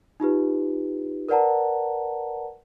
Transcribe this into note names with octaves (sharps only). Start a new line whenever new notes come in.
D#4 F4 G4 B4
A#4 B4 D5 F#5 A5 A#5